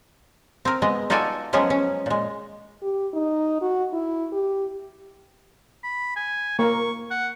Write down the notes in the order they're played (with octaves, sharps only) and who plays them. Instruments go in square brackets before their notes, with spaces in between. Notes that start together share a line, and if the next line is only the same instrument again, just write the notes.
[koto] C4 A#4
G#3 B3 D#5
D#4 F4 F#4 A4 D5 G#5
F3 F#3 G#3 B3 C#4 G#4
C#4
A#2 G#3
[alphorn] G4
D#4
F#4
E4
G4
[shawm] B5
G#5
[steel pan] A#3 A#4 [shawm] C#6
[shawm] F#5